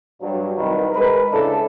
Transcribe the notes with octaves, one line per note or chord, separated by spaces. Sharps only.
G2 F#3
C2 D#3 B4
G#3 A#4 B4
C#3 D4 E4 A4